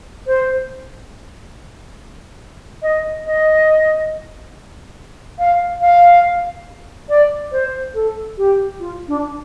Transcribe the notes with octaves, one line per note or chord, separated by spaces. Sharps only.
C5
D#5
D#5
F5
F5
D5
C5
A4
G4
F4
D4